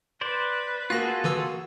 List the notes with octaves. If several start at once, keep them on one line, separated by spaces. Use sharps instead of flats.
B4 C5 D5
A#3 F4 F#4 G#4 A4 F#6 A#6
D3 E3 E6